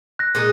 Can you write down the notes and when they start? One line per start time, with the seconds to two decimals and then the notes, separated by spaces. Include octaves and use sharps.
0.19 F#6 A#6
0.35 A#2 G#3 D#4 G#4